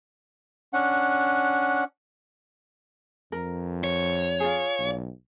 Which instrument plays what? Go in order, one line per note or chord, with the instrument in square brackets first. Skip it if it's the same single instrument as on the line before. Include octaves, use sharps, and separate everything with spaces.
[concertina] C#4 D4 F#5
[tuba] F2 [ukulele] A#4
[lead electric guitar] C#5
[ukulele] F4 G#4
[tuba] B1